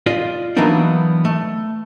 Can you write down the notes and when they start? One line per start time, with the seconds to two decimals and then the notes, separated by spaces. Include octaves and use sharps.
0.06 F4 D5 D#5
0.57 E3 F#3 A#3 B3 D4 D#4
1.25 A3